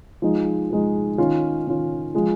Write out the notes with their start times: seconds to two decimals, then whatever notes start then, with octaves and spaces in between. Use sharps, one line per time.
0.22 F3 G#3 D#4
0.70 F3 G#3 D#4
1.18 D#3 C#4 F4
1.67 D#3 C#4 F4
2.15 F3 G#3 F4